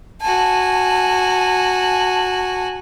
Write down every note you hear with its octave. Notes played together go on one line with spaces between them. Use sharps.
F#4 G#5 A5